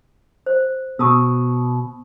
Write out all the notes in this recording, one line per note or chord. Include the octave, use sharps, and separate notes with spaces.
C5
B2 C#6 D#6 E6